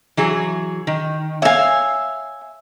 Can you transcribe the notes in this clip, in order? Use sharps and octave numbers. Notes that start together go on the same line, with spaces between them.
E3 F#3 G#4
D#3
C#5 E5 F5 G#5